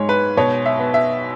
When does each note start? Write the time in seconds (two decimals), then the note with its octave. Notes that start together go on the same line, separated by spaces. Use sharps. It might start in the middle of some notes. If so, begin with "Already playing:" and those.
Already playing: G#2 G#3 C#5
0.09 B4
0.37 B2 C#5
0.66 E5
0.79 B3
0.94 E5